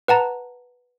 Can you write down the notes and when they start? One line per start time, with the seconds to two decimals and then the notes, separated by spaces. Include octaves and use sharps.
0.08 B4 F#5 A5 A#5